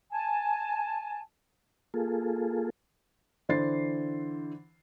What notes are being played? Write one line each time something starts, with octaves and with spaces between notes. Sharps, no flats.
G#5 A5
A#3 F4 G#4 A4
D3 E3 C5 A6 C7